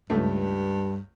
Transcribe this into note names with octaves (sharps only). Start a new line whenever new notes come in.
C#2 G2 A3